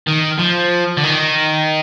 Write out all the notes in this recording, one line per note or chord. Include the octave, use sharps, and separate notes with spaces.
D#3
F3
D3
D#3